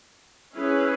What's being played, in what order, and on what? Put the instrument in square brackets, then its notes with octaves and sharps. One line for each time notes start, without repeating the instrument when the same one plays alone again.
[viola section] C#4 E4 G#4 B4